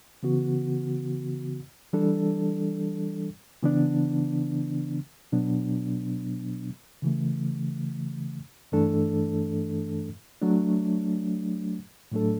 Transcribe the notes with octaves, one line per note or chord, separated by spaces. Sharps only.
C#3 E3 B3 F#4
E3 G3 D4 A4
C#3 E3 B3 D4
B2 F#3 B3 D4
C#3 E3 A3
G2 E3 A3 D4 A4
F#3 A3 D4
A2 F#3 A3 D4 A4